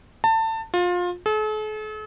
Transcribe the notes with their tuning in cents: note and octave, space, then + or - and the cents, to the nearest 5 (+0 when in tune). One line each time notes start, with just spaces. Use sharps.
A5 +25
F4 +25
A4 -45